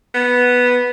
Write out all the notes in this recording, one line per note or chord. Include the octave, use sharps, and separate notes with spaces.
B3